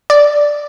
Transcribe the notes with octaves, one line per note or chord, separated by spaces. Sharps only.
D5